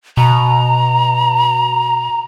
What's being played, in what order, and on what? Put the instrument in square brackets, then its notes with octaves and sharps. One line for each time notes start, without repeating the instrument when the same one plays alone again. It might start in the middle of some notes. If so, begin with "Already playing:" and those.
[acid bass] B2 [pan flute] A#5